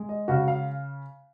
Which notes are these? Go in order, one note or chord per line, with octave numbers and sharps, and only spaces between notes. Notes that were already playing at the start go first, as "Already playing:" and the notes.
Already playing: G#3
D#5
C#3 F#4 F#5
F5